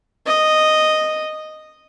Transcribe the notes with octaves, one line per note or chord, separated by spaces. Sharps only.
D#5